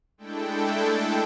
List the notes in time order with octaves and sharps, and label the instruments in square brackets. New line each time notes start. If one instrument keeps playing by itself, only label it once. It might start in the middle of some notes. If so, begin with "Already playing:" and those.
[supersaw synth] G#3 A3 D4 E4 A4 G5